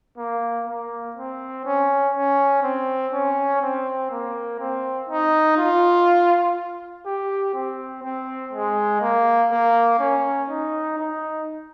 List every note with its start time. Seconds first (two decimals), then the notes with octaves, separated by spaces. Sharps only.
0.18 A#3
0.67 A#3
1.16 C4
1.65 C#4
2.14 C#4
2.63 C4
3.13 C#4
3.62 C4
4.11 A#3
4.60 C4
5.09 D#4
5.57 F4
7.06 G4
7.54 C4
8.03 C4
8.53 G#3
9.02 A#3
9.51 A#3
9.99 C#4
10.49 D#4
10.99 D#4